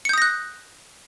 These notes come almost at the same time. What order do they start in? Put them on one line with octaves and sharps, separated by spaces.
C#7 G6 D#6 A#6 F#6